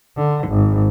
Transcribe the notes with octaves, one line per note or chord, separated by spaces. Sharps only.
D3
G#1